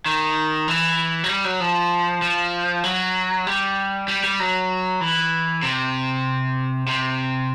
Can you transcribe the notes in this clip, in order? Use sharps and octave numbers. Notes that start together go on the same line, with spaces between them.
D#3
E3
F#3
G3
F#3
F3
F3
F#3
G3
G3
G3
F#3
E3
C3
C3